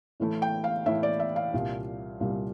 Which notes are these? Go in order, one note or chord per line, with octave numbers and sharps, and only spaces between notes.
A2 E3 A3 E4
G5
F5
A2 E3 A3 E4 E5
D5
E5
F5
C2 A#2 G3
C2 A#2 G3